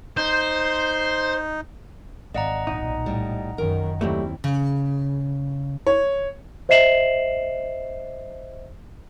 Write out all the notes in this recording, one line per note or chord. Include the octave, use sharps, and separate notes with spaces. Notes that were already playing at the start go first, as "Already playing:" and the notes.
D#4 C5
G#1 D5 D#5 F5 F#5 A#5
B1 A#2 D#4
A2 G3
F#2 D#3 A#4
D#2 F#3 G3 A3 C4 E4
C#3
C#5
C5 D#5 E5 C7 E7 F#7